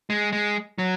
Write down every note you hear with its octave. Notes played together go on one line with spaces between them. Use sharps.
G#3
G#3
F#3